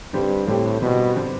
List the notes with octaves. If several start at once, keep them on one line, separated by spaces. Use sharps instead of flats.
G2 D3 G3 C4 G4
A2 D3 G3 C4 G4
B2 D3 G3 C4 G4
D3 G3 C4 G4